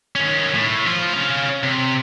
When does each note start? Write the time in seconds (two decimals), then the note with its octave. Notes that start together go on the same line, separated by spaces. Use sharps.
0.15 D#3 C#4
0.54 A2
0.86 F3 F4
1.13 C#4 F5
1.63 C3